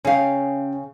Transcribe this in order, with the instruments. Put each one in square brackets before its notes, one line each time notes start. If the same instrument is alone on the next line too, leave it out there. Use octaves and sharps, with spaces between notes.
[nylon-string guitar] C#3 F5 [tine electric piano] C#4 G5